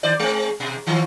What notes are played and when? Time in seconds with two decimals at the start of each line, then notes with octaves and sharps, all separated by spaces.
0.03 D#3 C5 D5
0.19 G#3 C4
0.60 B2
0.86 D#3 F3